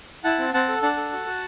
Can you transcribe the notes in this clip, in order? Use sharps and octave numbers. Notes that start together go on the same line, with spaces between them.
E4 F#5 A5
C4
C4 F#5 A5
A4
D4 F#5 A5
A4
F#4
F#4